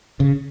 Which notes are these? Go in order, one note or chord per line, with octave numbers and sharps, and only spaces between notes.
C#3